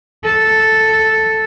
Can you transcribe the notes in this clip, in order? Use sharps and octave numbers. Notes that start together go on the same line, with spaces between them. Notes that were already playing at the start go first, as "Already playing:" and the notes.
A4